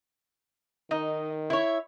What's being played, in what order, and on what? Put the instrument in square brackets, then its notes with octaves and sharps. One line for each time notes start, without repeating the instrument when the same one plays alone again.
[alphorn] D#3 [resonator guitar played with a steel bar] D#4 [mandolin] D#5
[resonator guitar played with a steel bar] E4 C#5 [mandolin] E5